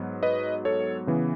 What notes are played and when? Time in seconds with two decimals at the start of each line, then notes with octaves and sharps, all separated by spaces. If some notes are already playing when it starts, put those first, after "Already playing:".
Already playing: G#2 F#3 B3
0.23 B4 D#5
0.65 A4 C#5
1.07 C#3 E3 B3